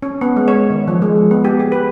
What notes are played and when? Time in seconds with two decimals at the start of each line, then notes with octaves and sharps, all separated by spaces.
0.02 C#4
0.21 B3
0.36 G#3
0.48 C#5
0.70 D#3
0.88 F3
1.02 G#3
1.16 F3
1.31 B3
1.44 G4
1.59 G#4
1.72 B4